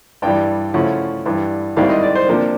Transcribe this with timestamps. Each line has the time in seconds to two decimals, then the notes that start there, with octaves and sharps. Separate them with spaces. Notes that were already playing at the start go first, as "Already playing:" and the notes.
0.22 G2 E3 G3 G5
0.74 C#3 F3 A3 C#4 E4 F#5
1.25 G2 E3 G3
1.77 G#2 D#3 G3 C4 E4 F5
1.90 D#5
2.03 D5
2.15 C5
2.29 C3 F3 A#3 D4